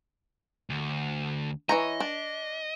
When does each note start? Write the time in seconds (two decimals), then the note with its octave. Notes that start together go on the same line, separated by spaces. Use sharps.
0.70 D2
1.69 E3 C#5 D#5 A#5
2.00 D4